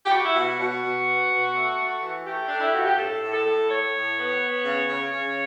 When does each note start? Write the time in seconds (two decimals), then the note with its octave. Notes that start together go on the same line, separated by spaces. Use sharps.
0.06 G4
0.11 G3 F#4
0.25 E4
0.35 B2 F#4
0.59 B2 F#4
0.83 B2
1.07 B3
1.31 B2
1.54 A3
1.79 A3
2.02 E3
2.26 A3 G4
2.48 A3 D4
2.60 E4
2.73 G2 F#4
2.85 G4
2.98 A2 A4
3.22 A2
3.34 A4
3.46 A2
3.69 A2 C#5
3.94 A2
4.18 B3
4.42 B3
4.65 C#3
4.88 C#3
5.12 C#3